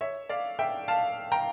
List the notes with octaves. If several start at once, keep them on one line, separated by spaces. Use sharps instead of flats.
C#5 E5
D5 F5
E5 G5
F5 A5
G5 A#5